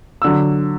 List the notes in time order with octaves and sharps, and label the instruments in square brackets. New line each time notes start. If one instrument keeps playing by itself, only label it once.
[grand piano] D3 F#3 E6